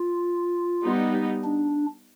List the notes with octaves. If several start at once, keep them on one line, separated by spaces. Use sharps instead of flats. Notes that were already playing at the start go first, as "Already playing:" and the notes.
Already playing: F4
G3 B3 D#4
D4